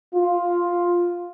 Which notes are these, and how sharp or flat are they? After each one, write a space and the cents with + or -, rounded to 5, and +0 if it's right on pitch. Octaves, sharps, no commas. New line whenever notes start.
F4 +5